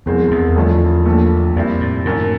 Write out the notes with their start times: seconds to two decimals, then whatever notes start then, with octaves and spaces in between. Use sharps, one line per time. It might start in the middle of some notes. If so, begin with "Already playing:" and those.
0.06 C2 F2 B2 G#3 C4
0.31 E2
0.56 F2 D3 F3 A3 C#4
1.05 A#1 A#2 F3 A3
1.55 F2 A#2 G3 C4 E4
1.80 A2
2.05 F#1 F#2 A2 D#3